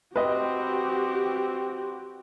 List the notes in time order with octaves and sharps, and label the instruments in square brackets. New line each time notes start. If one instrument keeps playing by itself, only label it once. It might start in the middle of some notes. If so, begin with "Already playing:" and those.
[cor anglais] C4 [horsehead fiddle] F#4 G4 [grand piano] B4 D#5